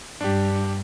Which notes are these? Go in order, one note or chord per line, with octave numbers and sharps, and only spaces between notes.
G2 D4 G4